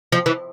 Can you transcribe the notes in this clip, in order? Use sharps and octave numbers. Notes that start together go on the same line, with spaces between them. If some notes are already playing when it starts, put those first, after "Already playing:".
F3
E3